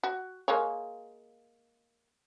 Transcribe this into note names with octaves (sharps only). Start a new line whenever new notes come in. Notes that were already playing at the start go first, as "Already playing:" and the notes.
F#4
G#3 A#3 C#5